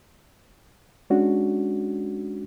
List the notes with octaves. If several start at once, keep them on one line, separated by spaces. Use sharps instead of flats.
G#3 C#4 D4 F#4